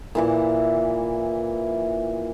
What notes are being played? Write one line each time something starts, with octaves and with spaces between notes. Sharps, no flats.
A#2 E3 E4